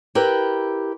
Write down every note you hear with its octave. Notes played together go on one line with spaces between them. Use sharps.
E4 G4 A#4 B4